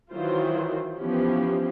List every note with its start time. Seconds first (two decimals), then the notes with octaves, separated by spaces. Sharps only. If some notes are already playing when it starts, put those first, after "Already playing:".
0.12 D#3 E3 F#3 F4 C5
0.98 E3 F3 B3 C#4 G4